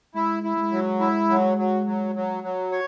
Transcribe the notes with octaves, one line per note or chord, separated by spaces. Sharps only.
G#3 E4
E4
G#3
F#3
E4
F#3
F#3
F#3
F#3
F#3
C#5